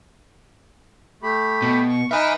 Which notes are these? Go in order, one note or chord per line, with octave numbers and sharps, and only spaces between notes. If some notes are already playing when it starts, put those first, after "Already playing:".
A3 G4 B5
B2
C#6
D#4 B4 E5 G#5 F6